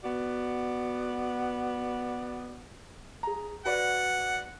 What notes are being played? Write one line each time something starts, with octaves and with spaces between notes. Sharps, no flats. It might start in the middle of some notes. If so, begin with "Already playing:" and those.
B3 F#4 D5
G#4 A#5
F#4 B4 D5 F#5